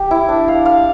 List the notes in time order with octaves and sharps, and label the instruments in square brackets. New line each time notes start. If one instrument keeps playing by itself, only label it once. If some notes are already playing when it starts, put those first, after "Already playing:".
Already playing: [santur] G4
E4
D4
F5
F5